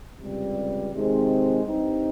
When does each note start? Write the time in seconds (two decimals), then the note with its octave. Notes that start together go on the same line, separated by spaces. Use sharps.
0.19 C#2 C3 G3
0.93 C3 D#3 G#3 C4
1.64 G2 G3 C4 D#4